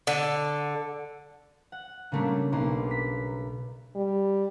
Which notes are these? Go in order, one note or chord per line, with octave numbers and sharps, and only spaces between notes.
D3
F#5
C#3 G3 A3 A#3 D4
B1 A#3 C6
B6
G3